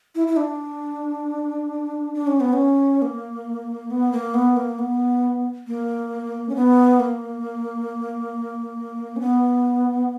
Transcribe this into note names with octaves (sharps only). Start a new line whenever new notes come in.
E4
E4
D4
D4
C#4
B3
C#4
A#3
B3
A#3
B3
A#3
B3
A#3
C#4
B3
A#3
C#4
B3